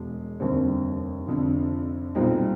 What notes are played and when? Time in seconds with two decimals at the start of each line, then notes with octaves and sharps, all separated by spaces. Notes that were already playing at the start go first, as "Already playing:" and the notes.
Already playing: E1 G#3
0.40 F1 D#2 D3 G3 C4
1.28 F1 F2 D3
2.15 B1 A#2 G3 C4 D#4